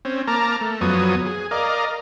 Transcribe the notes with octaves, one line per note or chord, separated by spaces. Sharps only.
C4 C#4
A#3 A5 A#5 D6 F6
A3
F#2 F3 F#3 B3 C#5 D#6
G#4
A#4 D5 D#5 F5